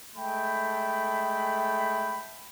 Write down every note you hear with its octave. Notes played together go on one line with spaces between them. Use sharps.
G#3 A3 G5 B5